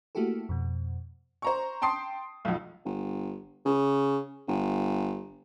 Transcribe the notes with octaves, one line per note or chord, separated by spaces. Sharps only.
A3 A#3 E4 F#4 G4 A4
F2 B2
C5 A#5 C#6
G5 A5 C6 D#6 C7
B1 F2
G1
C#3
G1